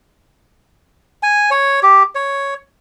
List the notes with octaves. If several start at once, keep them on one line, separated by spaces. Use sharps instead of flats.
G#5
C#5
G4
C#5